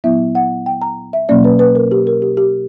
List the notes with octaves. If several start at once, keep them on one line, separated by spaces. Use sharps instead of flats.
A#2 F#3 B3 E4 E5
F#5
G5
A#5
E5
B2 F#3 A#3 C#4 D5
B4
B4
A#4
G4
A#4
G4
G4